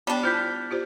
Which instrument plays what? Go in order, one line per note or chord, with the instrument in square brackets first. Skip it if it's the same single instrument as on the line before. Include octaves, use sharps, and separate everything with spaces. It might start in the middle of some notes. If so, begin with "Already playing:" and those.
[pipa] G3 D4 [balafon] B3 G5 A5
[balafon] E4 F4 C5 [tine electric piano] F6 G6 B6
[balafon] F4 G4 C5